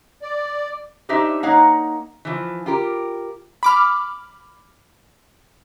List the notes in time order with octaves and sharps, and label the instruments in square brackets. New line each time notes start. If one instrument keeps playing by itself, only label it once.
[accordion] D5
[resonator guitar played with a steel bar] D4 D#4 G4 C5 E5
A#3 D#4 C#5 F5 F#5
E3 F3
F4 G4 A#4
[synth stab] B5 D6 F6